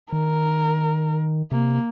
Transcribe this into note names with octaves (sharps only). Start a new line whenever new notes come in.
D#3 A#4
C3 A#3